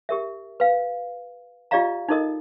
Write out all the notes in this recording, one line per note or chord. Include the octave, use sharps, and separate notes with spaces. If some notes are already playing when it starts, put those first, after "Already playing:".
G4 A#4 E5
B4 F5
F4 G4 D5 D#5 F5 A#5
D#4 E4 A4 A#4 D#5 D#6